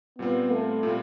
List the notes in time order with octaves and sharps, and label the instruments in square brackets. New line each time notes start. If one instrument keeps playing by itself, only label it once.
[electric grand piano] A#2 G3 C4 F4 [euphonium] B3
[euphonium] A3
[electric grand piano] A#2 G3 C4 F4